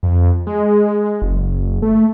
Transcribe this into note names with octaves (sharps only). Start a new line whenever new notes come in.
F2
G#3
F#1
A3